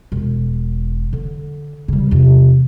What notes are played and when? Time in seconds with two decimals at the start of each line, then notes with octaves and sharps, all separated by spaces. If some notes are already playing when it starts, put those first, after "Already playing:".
0.12 E1
1.13 D3
1.88 C#3 G3
2.11 E2 C3